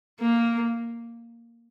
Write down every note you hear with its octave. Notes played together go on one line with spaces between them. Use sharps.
A#3